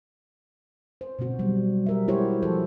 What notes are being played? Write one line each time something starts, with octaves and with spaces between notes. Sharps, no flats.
C5
B2 D3 C4 F#4
F#3 G3
G4 A#4 E5
G#3 E4 F#4 G4 C5 C#5
F3 A4 C5 C#5